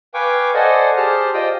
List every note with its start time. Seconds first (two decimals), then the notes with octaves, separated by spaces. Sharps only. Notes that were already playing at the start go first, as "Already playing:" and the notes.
0.14 B4 F5 G5 G#5 C#6 D6
0.54 A4 C5 D5 D#5 F#5 G#5
0.97 G4 G#4 C5 A5 F6
1.34 F4 C5 D5 D#5 G5 D#6